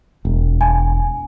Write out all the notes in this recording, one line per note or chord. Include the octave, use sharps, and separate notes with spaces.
E1
G#5